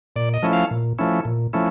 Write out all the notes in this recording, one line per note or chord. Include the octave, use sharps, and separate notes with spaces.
A#2 D5
D#5
F3 A3 C#4 E4
F5
A#2
F3 A3 C#4 E4
A#2
F3 A3 C#4 E4